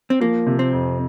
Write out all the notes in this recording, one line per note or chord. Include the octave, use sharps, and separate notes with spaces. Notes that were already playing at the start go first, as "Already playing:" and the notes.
C4
F3 A#3
C3
C4
F2